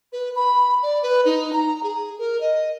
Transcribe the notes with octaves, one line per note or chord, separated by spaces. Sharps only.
B4
B5
D5
B4
D#4
A#5
G#4
A#4
D#5